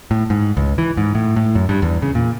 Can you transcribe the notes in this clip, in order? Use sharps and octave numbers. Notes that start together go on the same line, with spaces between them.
A2
G#2
C#2
E3
G#2
A2
A2
F#2
G2
E2
C#3
A#2